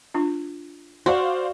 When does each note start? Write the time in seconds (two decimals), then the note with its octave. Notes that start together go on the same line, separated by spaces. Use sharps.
0.14 D4 F4
1.06 F#4 C5 D5 F5